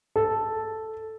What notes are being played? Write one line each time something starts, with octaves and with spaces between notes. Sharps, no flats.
A4